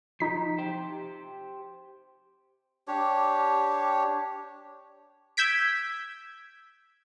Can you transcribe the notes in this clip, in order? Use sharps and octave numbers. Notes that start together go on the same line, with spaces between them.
F3 D#4 B6
G4 C5
D4 G4 C#5
E6 G6 G#6 B6 D7